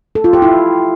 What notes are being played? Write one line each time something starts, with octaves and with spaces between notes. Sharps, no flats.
A4
F4
G4
E4